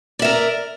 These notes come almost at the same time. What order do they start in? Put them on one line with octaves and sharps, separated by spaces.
D5 E5 A#4